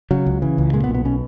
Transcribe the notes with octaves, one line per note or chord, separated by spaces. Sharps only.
C#3 F#3
C#2
C#3 E3
C#2
A#2 G#3
B3
B1
B3
B2 C#4